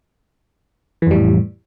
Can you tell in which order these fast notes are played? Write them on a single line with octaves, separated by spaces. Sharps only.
E3 F2 G3 A2